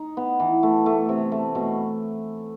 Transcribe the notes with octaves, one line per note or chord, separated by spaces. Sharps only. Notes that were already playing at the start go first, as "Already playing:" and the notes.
Already playing: D#4
B3
E3
A3
A3
C3
A3
B2